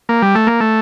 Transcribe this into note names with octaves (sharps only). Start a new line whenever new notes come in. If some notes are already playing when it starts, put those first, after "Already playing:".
A#3
G3
A3
A#3
A3